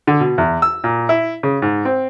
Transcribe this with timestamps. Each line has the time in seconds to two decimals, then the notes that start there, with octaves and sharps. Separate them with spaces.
0.07 D3
0.20 B2
0.38 E2
0.62 E6
0.84 A#2
1.09 E4
1.43 C#3
1.62 G#2
1.85 C4